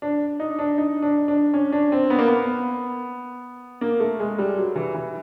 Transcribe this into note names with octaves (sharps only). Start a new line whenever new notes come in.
D4
D#4
D4
D#4
D4
D4
C#4
D4
C4
B3
A#3
B3
A#3
A3
G#3
G3
F#3
E3
E3